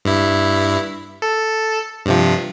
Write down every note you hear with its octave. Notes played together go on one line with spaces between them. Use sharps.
G2 E4
A4
G2 C3 F3